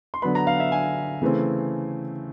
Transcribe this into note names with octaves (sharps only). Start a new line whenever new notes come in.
C6
D3 F#3 B3 B5
A#5
F5
E5
G#5
C#3 E3 A3 C4